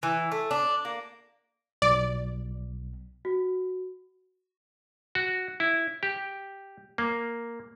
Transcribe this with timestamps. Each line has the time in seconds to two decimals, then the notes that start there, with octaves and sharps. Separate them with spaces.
0.03 E3
0.32 A3
0.51 D4
0.85 A#3
1.82 B1 D5
3.25 F#4
5.15 F#4
5.60 E4
6.03 G4
6.98 A#3